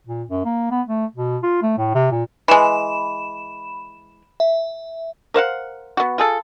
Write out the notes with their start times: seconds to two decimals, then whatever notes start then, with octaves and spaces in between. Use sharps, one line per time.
0.07 A#2
0.30 F#2
0.44 A#3
0.71 B3
0.88 A3
1.15 B2
1.43 F4
1.62 A3
1.78 A2
1.95 C3
2.11 A#2
2.48 E3 G#3 B5 E7
4.40 E5
5.34 A#4 C5 F5 F#5
5.97 B3 F#4
6.18 F4 G#4 A4